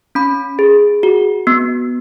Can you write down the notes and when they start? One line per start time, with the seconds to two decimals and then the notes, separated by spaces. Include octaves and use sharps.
0.15 C#4 B5
0.59 G#4
1.03 F#4
1.47 B3